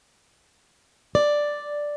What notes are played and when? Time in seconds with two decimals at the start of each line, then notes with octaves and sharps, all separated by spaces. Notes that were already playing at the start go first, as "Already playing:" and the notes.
1.15 D5